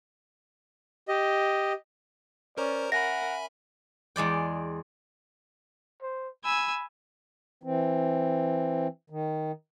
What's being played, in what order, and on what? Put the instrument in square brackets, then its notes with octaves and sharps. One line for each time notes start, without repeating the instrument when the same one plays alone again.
[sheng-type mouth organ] G4 D#5
[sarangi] C#4 [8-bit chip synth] A#4 C5 A#5 [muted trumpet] D5
[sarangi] A#4 [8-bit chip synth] E5 G#5 B5 [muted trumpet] F#5 [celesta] A#6
[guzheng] E2 G#3 D5 G5
[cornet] C5
[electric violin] G#5 E6 [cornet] B5
[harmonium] E3 C4
D#3